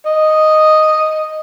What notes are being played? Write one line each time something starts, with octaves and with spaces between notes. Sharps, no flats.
D#5